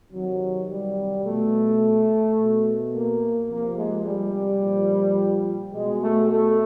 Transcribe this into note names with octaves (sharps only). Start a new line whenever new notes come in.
C3 D#3 F#3
G3
B2 A3
B2
A#3
C3 F3 A#3
G#3
G3
A#2 F3
B2 G#3
A3
A3